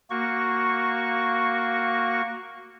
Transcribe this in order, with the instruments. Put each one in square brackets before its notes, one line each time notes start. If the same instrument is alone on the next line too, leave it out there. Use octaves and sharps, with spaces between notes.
[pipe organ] A#3 F#4 C#6